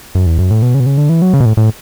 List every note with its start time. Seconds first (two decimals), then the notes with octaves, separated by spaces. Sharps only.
0.15 F#2
0.26 E2
0.38 F#2
0.50 A2
0.62 B2
0.74 C#3
0.80 B2
0.86 C#3
0.98 D3
1.09 E3
1.22 F#3
1.34 C#3
1.40 B2
1.46 A2
1.57 A2